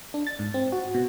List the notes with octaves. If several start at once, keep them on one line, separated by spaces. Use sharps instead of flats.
D4
A6
G#2
C4
F#4
B2